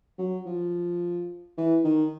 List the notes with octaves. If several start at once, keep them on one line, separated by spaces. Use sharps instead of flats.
F#3
F3
E3
D#3